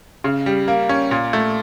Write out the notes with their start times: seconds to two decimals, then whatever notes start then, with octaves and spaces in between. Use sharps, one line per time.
0.24 C#3
0.46 G3
0.68 A#3
0.89 C#4
1.11 A#2
1.33 A3